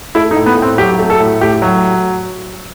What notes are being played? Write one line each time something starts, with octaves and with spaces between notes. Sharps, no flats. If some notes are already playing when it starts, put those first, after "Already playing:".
A3 E4
D#4
A2
B3
A2
C4
F#3 G4
A3
A4
A2
A2 G4
F#3